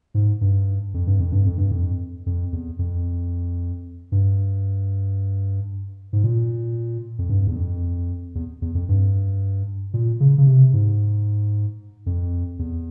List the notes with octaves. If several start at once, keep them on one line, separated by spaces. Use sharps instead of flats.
G#2
G2
F2
G2
F2
G2
F2
G2
F2
F2
E2
F2
G2
G#2
A#2
F2
G2
E2
F2
E2
E2
F2
G2
A#2
C#3
C#3
C3
G#2
F2
E2